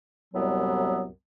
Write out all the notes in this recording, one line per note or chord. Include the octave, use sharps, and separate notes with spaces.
C2 F#2 A2 F#3 G3 B3